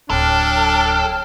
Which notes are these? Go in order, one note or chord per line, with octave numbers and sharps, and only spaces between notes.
D1 F#3 D4 A4 C#5 G5 F6